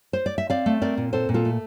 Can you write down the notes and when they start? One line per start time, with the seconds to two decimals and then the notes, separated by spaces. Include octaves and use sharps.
0.13 C5
0.26 D5
0.38 E5
0.50 C4 D5 F5
0.66 A3
0.82 C4 A#4 D5
0.97 A#2
1.13 C4 A4 C5
1.29 A#2
1.34 F4 A4
1.45 A3